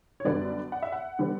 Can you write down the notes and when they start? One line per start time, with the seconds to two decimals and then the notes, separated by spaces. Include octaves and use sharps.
0.20 C#5
0.25 F#2 D3 G3 B3 D5
0.72 F#5
0.82 E5
0.92 F#5
1.19 D3 G3 B3